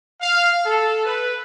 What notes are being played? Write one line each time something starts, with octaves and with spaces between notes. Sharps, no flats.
F5
A4
B4